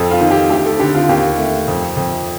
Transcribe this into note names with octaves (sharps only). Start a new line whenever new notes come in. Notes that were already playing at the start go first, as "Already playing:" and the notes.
Already playing: F2 A4
F4
D#3
G4
D2 G4
A4
D3 G4
F4
D#2 G4
A3
F2
F2